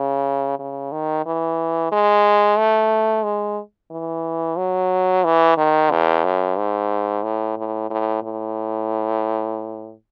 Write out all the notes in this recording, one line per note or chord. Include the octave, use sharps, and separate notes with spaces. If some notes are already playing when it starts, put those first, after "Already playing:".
Already playing: C#3
C#3
D#3
E3
G#3
A3
G#3
E3
F#3
E3
D#3
E2
F#2
G#2
A2
A2
A2
A2